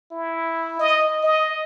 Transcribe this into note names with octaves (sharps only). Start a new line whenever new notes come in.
E4
D#5
D#5